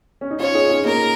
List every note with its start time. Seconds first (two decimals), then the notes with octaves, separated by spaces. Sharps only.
0.21 C#4
0.31 D#4
0.39 C#4 F4 C#5
0.54 D#4 G#4
0.70 C#4 F4
0.85 A#3 D#4 A#4